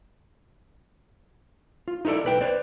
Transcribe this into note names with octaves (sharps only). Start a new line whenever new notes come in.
F4
D#4 E4 G4 A4 D5
B1 B4 G5
B4 C5 D5